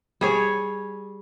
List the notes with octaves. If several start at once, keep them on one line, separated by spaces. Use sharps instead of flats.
G3 G#4 C#5